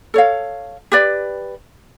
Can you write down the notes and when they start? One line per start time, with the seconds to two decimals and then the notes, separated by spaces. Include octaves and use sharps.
0.14 A4 C#5 F5
0.92 G4 B4 D5